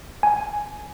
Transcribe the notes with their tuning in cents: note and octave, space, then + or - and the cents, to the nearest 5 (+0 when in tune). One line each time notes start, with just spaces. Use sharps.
G#5 +5